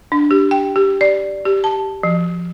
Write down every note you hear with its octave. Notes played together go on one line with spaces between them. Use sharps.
D4
G4
G5
G4
D5
G4
A5
F3